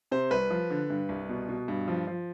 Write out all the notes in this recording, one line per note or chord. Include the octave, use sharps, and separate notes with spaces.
C3 C5
C2 B4
F3
D3
G2
C2
B2
B2
G2
F3
F3